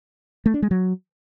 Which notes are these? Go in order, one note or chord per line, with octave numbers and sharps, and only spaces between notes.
A3
D4
G#3
F#3